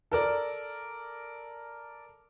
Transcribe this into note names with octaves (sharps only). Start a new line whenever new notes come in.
A4 A#4 D5